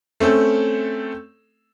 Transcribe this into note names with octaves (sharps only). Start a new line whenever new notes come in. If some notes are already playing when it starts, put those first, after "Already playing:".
A3 C4 C#4 A4